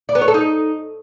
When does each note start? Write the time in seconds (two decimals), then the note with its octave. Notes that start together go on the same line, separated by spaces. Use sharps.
0.09 D5
0.15 B3
0.22 C#5
0.28 A4
0.34 D#4